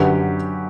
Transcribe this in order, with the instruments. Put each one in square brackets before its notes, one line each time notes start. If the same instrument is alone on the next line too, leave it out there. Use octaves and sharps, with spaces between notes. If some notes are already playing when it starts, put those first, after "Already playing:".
Already playing: [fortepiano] F#2 D3 G4 B4